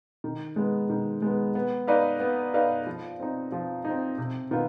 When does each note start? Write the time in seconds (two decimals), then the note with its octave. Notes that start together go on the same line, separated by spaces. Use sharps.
0.24 D#3
0.56 G#3 B3
0.90 D#3
1.22 G#3 B3
1.55 B3
1.87 D#4 B4 D5 F5
2.20 B3
2.54 D#4 B4 D5 F5
2.87 F3
3.20 C4 D#4
3.52 F3
3.85 D#4
3.90 C4
4.18 C3
4.51 D#3 B3 F4